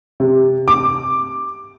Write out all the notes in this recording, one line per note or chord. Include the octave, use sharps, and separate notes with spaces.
C3
D6